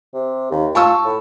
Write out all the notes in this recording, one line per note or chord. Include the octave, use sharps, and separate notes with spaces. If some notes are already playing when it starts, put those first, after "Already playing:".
C3
D#2
F4 A5 C#6 E6
A2